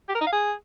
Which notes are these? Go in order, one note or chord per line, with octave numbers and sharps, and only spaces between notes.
G4
A#4
D#4
F5
G#4